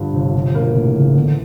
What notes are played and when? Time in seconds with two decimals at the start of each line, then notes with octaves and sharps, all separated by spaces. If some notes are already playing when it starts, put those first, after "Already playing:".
Already playing: G2 D3 F3
0.14 G1 C3
0.34 C3 F3
0.54 B2 A#3
0.75 A2 C3
0.95 A1 C#3
1.15 D3 B3